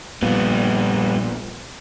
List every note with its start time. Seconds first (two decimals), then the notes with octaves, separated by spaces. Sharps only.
0.23 A#1 A#2 G3 B3